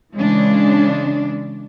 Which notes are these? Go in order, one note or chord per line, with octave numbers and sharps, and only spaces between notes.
C#3 E3 G#3 C#4 D4